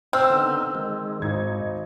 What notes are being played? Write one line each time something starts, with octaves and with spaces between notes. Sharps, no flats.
C4 E6 F6
D3 B3 D#4
D#3 G#3
G#1 G#2 D#4 G#6